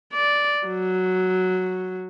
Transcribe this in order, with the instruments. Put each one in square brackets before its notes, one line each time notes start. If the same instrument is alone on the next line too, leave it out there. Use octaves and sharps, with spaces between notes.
[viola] D5
F#3